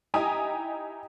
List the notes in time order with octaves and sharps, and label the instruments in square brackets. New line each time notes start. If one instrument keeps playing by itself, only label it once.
[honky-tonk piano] D#4 E4 G4 G#5 A#5 D#6